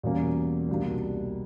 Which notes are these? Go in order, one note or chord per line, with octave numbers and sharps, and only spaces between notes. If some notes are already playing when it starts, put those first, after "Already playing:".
E2 B2 G3 A#3 C#4
C2 B2 G3 A#3 D4